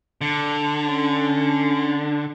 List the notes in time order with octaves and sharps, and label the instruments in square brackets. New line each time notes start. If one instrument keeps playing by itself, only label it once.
[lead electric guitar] D3
[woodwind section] C#4